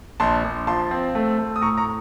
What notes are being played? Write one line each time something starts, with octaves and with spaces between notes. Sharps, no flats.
A#1 A5 C6
A#1
F3 A5 C6
C4
A3
A3
D#6
A2 A#5 C#6
A#5 C#6